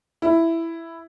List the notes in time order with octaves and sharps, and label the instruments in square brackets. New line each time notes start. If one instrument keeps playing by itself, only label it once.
[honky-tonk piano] E4